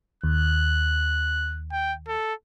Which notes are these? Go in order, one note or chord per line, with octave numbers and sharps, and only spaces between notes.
D#2 F#6
G5
A4